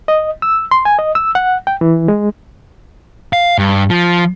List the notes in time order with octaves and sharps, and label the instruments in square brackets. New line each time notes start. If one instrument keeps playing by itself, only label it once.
[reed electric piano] D#5
E6
C6
G#5
D#5
E6
F#5
G5
E3
G#3
[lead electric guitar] F5
G2
F3